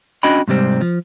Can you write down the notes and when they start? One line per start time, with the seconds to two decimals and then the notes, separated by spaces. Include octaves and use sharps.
0.23 C#4 D4 F#4 D#5 G5 B5
0.48 G#2 C3 G3 C4
0.81 F3